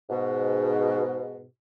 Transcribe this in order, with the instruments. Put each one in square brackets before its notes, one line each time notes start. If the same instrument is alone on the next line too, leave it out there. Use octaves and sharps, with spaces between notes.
[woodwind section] G#2 B2